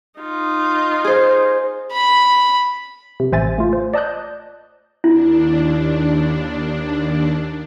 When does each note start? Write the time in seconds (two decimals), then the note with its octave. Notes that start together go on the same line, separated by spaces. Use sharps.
0.20 D#4 F4
1.04 G#4 C5
1.92 B5
3.20 C3
3.32 A1 C5 E5 G#5 A6
3.58 A3 F4
3.73 C5
3.94 D5 D#5 A5 D#6 F#6 G6
5.04 D#2 D4 E4